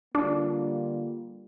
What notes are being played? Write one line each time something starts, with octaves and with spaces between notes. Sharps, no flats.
D3 G3 A#3 D4 F4